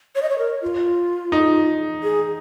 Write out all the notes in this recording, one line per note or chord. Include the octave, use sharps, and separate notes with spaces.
C#5
D#5
C#5
A#4
F4
D#4
G#4